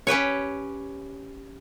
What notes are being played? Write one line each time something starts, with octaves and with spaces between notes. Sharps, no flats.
C#4 G4 B4 C#5